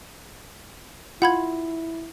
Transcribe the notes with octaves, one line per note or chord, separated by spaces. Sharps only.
E4 F4 F#5 B5 G#6